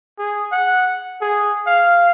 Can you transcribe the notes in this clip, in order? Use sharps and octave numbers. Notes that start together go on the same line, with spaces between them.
G#4
F#5
G#4
F5